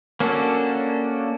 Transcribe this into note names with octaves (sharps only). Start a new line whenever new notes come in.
A#3 C#4 D4 F#4 A4